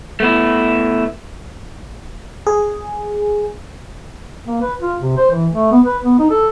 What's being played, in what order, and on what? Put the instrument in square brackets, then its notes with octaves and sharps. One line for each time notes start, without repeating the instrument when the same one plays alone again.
[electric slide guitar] A3 B3 E4
[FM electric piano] G#4
[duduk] A#3
B4
F4
C3
C5
E3
A3
B3
B4
B3
D#4
A4